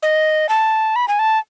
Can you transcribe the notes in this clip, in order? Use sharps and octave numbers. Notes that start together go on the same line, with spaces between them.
D#5
A5
B5
G#5
A5